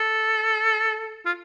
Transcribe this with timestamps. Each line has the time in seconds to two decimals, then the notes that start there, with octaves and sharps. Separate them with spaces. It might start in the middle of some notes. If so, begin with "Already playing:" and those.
Already playing: A4
1.26 F4